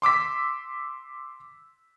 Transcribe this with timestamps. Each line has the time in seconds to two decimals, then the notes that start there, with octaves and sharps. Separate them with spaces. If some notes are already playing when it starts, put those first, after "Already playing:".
0.02 C6 D6 E6 B6